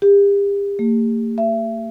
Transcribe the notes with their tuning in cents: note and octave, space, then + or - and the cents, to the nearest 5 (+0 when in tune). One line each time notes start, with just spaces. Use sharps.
G4 +40
A#3 -45
E5 +30